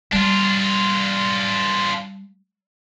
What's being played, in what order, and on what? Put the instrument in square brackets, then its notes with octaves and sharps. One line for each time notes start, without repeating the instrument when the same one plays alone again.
[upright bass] G3 [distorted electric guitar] D4 F4